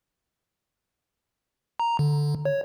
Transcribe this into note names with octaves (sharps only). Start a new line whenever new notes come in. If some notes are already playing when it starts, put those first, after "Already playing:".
A#5
D3
C#5